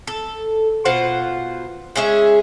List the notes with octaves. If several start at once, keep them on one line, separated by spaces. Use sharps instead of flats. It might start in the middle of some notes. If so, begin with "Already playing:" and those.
A4
B2 F4 C5 F#5
G#3 C#4 G#4 E5